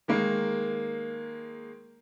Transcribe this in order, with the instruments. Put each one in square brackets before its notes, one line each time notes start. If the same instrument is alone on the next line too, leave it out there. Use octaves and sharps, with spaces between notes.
[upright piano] D#3 G#3 A#3